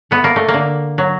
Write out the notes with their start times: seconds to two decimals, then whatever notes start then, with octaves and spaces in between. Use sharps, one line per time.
0.11 A3 B3
0.24 A#3
0.36 A3
0.48 A#3
0.54 D3
0.98 F#3